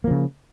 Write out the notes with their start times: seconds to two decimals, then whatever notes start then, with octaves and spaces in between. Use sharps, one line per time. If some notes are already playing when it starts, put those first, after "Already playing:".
0.04 A#3
0.07 F3
0.11 C#3